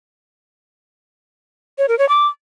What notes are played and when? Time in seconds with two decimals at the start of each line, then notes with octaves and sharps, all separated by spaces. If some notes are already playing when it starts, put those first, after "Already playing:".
1.78 C#5
1.88 A#4
1.99 C#5
2.09 D6